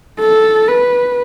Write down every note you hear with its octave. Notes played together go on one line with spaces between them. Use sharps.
A4
B4